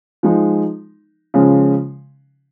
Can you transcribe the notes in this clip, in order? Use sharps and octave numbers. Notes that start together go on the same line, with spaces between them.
F3 G#3 D#4
C#3 F3 G#3 C#4